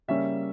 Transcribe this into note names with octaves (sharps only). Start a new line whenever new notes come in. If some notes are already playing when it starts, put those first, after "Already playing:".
C#3 G3 A#3 C#4 E5